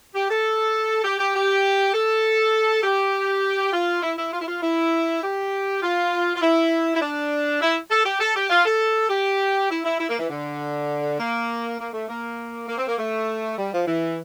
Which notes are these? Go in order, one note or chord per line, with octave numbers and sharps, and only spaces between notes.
G4
A4
G4
G4
G4
A4
G4
F4
E4
E4
F4
E4
F4
E4
G4
F4
F4
E4
E4
D4
E4
A4
G4
A4
G4
F4
A4
G4
E4
E4
E4
A#3
E3
D3
A#3
A#3
A3
A#3
A#3
C4
A#3
A3
G3
F3
E3